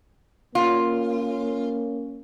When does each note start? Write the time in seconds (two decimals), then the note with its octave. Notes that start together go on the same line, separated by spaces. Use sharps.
0.55 A#3 C#4 F4